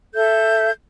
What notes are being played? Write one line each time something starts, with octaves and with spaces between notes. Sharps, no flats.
A4 E5 G6